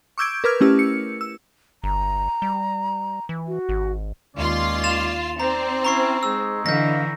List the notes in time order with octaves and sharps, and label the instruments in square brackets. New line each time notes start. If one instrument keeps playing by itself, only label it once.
[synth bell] C#6 D6 E6 G6 G#6 D7
A#4 B4 D6 F6 G#6
A3 C#4 E4 G4 E6
C#7
E6
[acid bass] G1 [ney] A#5
[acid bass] G3
E3
[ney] F#4
[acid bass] G#1
[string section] D#2 F4 C6 [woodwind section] G#3 C#4 D5
[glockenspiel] A6 E7 F7
[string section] C4 [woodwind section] D#4 C5 D5 [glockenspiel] A#5
[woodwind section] C#4 E4 [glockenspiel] A#5 C#6 C7
[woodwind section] G#3 D#4 G#4 [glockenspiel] E6
[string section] D3 E3 [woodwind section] D#5 F5 [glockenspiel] G6 A#6